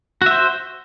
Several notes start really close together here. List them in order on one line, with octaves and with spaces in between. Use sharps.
F#4 E5 C5